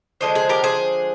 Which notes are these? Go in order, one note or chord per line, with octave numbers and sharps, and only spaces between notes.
D3 F3 G#3 C5 D#5
G#4 C5
G4 A#4
G#4 C5